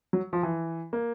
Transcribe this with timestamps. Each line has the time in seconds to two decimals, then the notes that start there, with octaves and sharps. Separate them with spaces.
0.13 F#3
0.33 F3
0.43 E3
0.93 A#3